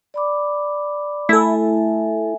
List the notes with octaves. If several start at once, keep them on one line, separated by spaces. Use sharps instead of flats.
D5 B5 D6
A3 E4 A4 E5 G#5